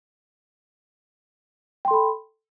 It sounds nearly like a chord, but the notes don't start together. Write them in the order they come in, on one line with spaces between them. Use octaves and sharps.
G5 C6 A4 B5